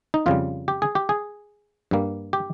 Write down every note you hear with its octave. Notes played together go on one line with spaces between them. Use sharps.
D#4
F2 C#3 G3 F4
G4
G#4
G4
G#4
G2 G3 A#3
G4